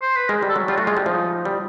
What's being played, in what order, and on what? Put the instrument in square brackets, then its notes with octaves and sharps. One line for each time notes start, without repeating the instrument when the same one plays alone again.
[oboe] C5
B4
[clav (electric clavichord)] G#3 [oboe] A#4
[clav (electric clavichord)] G3
[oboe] A4
[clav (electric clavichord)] F#3
[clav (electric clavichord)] G3 [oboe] F4
[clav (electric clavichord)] A3 [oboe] F#4
[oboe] F4
[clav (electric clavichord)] G#3
G3
[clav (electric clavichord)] F3 [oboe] D#4
[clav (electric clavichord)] G3